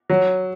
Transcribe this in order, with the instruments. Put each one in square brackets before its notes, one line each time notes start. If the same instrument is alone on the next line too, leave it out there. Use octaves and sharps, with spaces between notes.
[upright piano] F#3